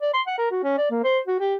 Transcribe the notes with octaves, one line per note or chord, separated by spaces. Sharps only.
D5
C6
F#5
A#4
F#4
C#4
D5
A#3
C5
F#4
G4